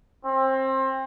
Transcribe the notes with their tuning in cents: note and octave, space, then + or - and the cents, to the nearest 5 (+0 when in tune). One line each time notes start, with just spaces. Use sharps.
C4 +25